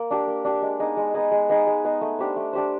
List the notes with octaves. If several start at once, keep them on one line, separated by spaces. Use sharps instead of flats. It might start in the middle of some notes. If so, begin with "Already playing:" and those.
Already playing: A#3
D4 G4
A#3
D4 G4
G#3
B3 D#4 G#4
G#3
B3 D#4 G#4
G#3
B3 D#4 G#4
G#3
B3 D#4 G#4
A3
D4 G4 C5
A3
D4 G4 C5